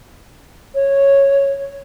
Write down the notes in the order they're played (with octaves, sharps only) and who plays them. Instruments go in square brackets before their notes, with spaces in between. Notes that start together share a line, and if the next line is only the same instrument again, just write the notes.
[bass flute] C#5